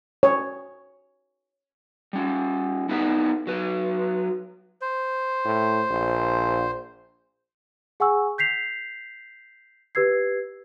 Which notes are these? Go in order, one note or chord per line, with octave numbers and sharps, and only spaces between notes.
C#5
G3 C#4
B3 D#4 E4 B4 E5
F#3 B4
C5
A2
A#1
G#4 F#5 G#5 C#6 E6
G6 B6 C7 F7
G4 B4 E6 G#6 C7